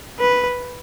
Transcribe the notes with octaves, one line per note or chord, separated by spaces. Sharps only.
B4